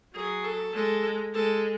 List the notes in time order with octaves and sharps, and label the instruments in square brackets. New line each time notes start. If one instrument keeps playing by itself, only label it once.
[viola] F#3 [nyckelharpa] G#4
[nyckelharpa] A4
[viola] G#3 [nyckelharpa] A4
[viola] G#3 [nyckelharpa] A4